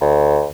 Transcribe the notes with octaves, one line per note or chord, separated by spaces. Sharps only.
D2